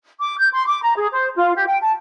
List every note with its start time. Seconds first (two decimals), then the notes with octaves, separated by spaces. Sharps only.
0.20 D6
0.38 G6
0.53 C6
0.66 D6
0.81 A#5
0.95 G#4
1.11 C5
1.36 F4
1.55 G4
1.67 G5
1.79 A5